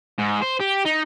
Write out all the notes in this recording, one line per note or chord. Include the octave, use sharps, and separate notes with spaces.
G#2
C5
G4
D#4